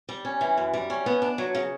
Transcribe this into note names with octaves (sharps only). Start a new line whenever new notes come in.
G3
C#4
E3
F#2
G3
C#4
B3
D4
F#3
C#3